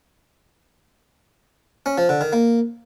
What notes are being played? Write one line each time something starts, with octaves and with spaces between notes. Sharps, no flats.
C#4
F3
D3
D#3
A#3